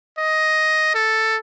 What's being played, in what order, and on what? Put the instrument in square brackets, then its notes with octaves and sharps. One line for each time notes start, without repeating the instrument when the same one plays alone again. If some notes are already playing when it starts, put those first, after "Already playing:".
[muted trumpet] D#5
A4